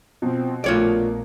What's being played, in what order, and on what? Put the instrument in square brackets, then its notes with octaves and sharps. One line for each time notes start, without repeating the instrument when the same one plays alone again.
[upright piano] B2 [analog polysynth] F3 C4
[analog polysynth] A#1 A#3 [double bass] A3 [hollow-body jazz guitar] F4 C#5 D5